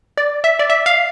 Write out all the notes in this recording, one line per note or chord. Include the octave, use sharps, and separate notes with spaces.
D5
E5
D5
E5
F5